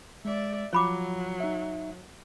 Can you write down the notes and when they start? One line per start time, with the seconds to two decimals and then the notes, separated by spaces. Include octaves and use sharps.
0.25 G#3 D5 E5
0.73 F3 F#3 F4 C#5 B5 D6
1.40 D#4 E5